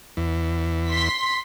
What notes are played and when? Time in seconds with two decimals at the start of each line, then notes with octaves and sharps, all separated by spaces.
0.17 E2
0.89 C6 B6